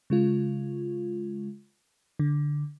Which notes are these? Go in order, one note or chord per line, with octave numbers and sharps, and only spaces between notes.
C#3 G#3 F4
D3